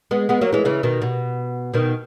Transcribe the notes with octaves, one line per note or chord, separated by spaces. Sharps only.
G#3 B3
G#3 B3
F#3 A#3
E3 G#3
C#3 E3
B2 D#3
B2
B2 D#3